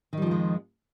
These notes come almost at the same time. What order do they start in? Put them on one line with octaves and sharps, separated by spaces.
D#3 G3 F3 F2 G#3